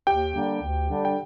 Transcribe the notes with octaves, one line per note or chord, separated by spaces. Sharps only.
D#2 G4 G5
D3 G3 A#3 D4
D2
D3 G3 D4
G5